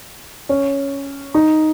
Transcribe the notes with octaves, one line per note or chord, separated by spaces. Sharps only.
C#4
D#4